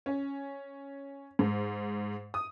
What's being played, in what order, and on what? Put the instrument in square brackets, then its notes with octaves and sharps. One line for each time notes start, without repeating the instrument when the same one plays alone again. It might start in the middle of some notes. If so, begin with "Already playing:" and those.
[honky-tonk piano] C#4
G#2
D#6